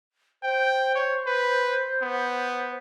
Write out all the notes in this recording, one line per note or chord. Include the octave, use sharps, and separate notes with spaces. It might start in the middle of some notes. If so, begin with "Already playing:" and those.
C5 G5
C#5
B4
B3